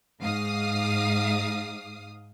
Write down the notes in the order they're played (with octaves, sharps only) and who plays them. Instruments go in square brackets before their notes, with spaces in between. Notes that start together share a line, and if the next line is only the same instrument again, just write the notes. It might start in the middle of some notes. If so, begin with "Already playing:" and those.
[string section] G#2 F5 D#6